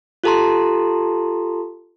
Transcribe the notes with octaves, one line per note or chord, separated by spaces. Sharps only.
F4 G4 A4 A5 A#5 C6